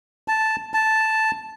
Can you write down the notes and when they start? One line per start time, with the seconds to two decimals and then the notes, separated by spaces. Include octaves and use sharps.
0.28 A5
0.74 A5